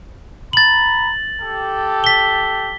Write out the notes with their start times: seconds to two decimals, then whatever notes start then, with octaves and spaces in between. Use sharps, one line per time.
0.53 A#5 B5 A6 F#7
1.41 G4 A4
2.04 B6 G7